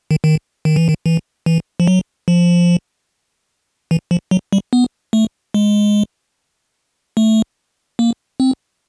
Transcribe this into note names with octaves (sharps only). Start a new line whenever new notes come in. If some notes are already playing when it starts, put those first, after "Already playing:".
D#3
D#3
D#3
E3
D#3
E3
E3
F3
F#3
F3
E3
F3
F#3
G3
B3
A3
G#3
A3
A#3
C4